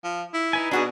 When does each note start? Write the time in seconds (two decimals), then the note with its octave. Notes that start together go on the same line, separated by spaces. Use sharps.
0.04 F3
0.34 E4
0.53 D#4 B4 G#5
0.71 B2 D4 F#4 G#4